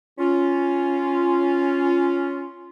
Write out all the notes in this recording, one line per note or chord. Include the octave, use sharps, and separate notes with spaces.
C#4 F4